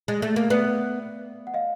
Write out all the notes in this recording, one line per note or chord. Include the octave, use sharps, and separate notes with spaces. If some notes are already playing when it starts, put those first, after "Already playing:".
G#3
A3
A#3
B3 D5 E5
F#5
D#5 F5